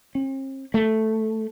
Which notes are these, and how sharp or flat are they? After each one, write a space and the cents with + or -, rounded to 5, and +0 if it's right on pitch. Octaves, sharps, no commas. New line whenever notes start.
C4 +45
A3 +0